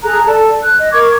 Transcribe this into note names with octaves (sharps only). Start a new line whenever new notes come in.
G#4 A4 A#5 F#6
A4 D5 A5
F#6
D#5
A#4 C#6 D6 G#6